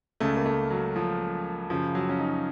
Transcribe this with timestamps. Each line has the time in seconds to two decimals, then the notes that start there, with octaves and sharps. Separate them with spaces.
0.20 C#2 C#3 A3
0.37 A#3
0.46 A3
0.70 F#3
0.96 F3
1.70 F#2 C#3 F3
1.95 F#3
2.09 C#4
2.19 D#4